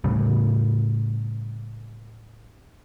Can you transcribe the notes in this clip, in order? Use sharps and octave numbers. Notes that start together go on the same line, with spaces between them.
A2 C#3 G3